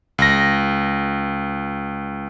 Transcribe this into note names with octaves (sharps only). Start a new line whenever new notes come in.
C#2 A#6